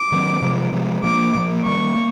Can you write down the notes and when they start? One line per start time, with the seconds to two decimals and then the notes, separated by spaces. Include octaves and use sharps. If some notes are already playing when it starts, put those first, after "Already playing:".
Already playing: D6
0.12 D#3 F#3 A3 C4
0.42 C3 F3 G#3
0.73 C3 F3 G#3
1.03 A#2 F3 A#3 D6
1.35 A#2 F3 A#3
1.65 D#3 G3 A#3 C#6
1.96 A#3